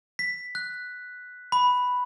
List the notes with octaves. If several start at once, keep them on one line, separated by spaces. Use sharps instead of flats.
B6
F#6
B5